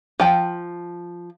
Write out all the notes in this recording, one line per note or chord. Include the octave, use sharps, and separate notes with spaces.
F3 G5